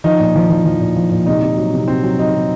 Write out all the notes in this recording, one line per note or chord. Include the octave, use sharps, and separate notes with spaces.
F3 D#4
A#2
F3
F3
F3
A#2
F3
A#2
C3 D#4
C3
F#3
C3
C3 C4
F#3
F#3 D#4
C3